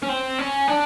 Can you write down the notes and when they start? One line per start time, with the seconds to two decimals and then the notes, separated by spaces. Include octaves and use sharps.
0.02 C#4
0.09 C4
0.38 C#4
0.68 D4